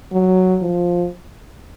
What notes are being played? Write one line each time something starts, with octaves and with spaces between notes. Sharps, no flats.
F#3
F3